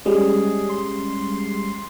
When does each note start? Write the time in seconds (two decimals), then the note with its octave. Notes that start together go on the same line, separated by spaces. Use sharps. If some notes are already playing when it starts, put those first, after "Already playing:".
0.05 G3 G#3 C#4 G#4
0.69 C6